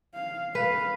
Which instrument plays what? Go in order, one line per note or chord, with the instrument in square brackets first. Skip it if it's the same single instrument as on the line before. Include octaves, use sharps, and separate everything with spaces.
[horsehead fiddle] F5
[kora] B4 [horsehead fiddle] F5